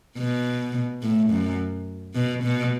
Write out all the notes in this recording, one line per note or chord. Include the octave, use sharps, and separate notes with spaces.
B2
A2
F#2
B2
B2